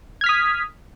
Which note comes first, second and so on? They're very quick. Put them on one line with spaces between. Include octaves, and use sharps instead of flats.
G#6 F6 B6 D#6